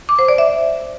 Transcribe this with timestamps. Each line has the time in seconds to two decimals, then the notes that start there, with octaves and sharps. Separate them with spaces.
0.09 D6
0.19 C5
0.28 D5
0.38 E5